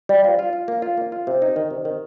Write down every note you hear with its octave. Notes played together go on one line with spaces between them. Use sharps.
G3
F4
F4
F4
A#3
F4
A#3
F4
C3
D#4
D#3
C3
D#3